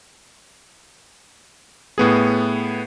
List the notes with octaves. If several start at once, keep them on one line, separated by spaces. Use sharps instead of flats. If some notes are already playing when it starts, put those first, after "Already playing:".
A2 B3 G#4